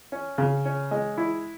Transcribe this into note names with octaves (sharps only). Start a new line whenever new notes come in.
C#4
C#3
C#4
G#3
E4